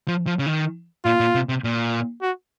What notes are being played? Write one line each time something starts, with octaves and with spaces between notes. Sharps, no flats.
F3
F3
C#3
D#3
A#2 F4
A#2
C3
C3
A#2
F#4